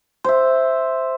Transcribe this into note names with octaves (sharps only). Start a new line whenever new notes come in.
C5 E5